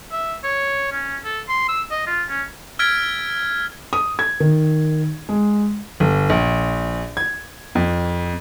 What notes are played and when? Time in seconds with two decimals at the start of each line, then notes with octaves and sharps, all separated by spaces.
0.12 E5
0.44 C#5
0.92 C#4
1.25 A4
1.49 C6
1.69 E6
1.91 D#5
2.07 F4
2.29 C#4
2.79 E6 F6 G#6 A6 B6 D7
3.93 D#6
4.19 G#6
4.40 D#3
5.29 G#3
6.00 G1
6.30 A#1
7.17 G#6
7.75 F2